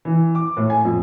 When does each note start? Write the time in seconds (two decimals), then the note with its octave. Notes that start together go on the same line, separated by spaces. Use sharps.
0.05 E3
0.35 D6
0.57 A2
0.70 G#5
0.85 F2